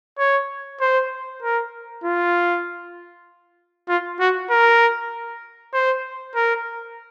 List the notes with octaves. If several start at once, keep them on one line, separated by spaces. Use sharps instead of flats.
C#5
C5
A#4
F4
F4
F#4
A#4
C5
A#4